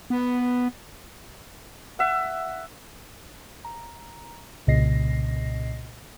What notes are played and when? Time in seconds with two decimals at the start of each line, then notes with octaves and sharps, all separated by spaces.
0.10 B3
1.99 E5 F#5
3.65 A#5
4.67 C2 A#2 C#3 D#5 A#6 C7